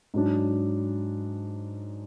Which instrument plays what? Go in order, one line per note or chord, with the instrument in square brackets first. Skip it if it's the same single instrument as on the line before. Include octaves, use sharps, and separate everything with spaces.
[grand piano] G#2 F#3 D4